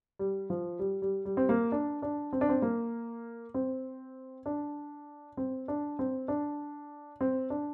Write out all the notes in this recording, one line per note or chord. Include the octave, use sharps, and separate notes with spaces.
G3
F3
G3
G3
G3
C4
A#3
D4
D4
C4
D4
C4
A#3
C4
D4
C4
D4
C4
D4
C4
D4